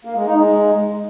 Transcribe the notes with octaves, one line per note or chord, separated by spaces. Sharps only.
A#3
G#3
D#4
G#3